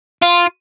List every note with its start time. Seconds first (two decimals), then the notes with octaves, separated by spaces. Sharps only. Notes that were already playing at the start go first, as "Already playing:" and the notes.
0.22 F4